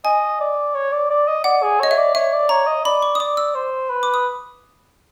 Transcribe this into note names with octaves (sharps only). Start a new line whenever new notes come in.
D#5 G#5
D5
C#5
D5
D5
D#5
D5 F#5
G#4
C#5 D#5
E5
D5
C#5 E5
D5
C#5 A#5
D#5
D5 B5
C#6
D#6
D5 D6
E6
C5
B4
D6
D#6